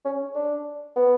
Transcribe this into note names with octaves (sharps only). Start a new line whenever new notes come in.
C#4
D4
B3